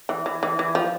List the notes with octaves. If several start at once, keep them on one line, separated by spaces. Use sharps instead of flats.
E3
E3
E3
E3
F3